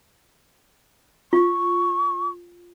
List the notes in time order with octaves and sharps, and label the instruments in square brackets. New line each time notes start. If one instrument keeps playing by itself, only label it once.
[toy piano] F4 [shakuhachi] C#6